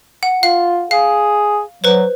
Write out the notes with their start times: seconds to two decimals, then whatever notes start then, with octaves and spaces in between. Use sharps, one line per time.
0.23 F#5
0.43 F4 F5
0.91 G#4 F5
1.84 F#3 B4 C5